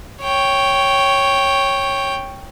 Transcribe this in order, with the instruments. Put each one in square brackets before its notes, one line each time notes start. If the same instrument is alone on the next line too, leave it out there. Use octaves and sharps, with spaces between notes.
[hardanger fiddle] C#5 G5